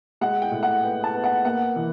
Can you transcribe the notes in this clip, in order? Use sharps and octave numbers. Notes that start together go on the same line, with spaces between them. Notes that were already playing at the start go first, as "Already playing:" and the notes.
G#3 F#5
G5
A2
F#5
B3 G5
A5
B3
F#5
A#3 F#5
E3